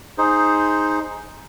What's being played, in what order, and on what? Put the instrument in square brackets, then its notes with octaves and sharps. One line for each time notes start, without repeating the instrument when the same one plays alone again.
[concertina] D#4 G#4 C5